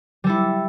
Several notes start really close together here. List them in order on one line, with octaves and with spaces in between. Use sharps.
G3 A4 E4